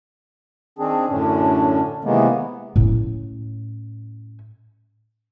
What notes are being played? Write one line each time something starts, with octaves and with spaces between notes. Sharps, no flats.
D#3 C4 D4 G#4
F#2 A2 D3 C#4 D4
C3 D#3 E3 G#3 A#3 B3
A2 C#4